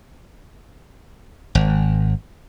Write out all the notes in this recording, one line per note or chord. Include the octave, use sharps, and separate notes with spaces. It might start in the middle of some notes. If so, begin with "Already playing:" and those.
G#1